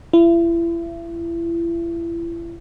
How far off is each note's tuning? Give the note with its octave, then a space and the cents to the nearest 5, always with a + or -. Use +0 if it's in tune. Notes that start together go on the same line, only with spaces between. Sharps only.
E4 +35